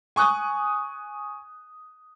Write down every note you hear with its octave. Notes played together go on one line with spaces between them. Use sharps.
G#5 C#6 D#6 F#6